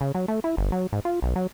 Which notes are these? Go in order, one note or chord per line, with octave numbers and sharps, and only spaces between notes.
C#3
F#3
A3
E4
G1
F#3
G#2
F4
B1
F#3